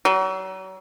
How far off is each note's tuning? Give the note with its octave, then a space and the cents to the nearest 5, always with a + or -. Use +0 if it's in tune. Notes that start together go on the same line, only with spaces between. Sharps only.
F#3 +35